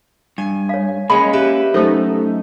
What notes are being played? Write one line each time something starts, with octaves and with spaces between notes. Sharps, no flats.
G2 G#5
C#5 F5
G#3 A#3 C#4 C#5 B5
G4 B4 E5
F#2 A3 D#4 A4 C5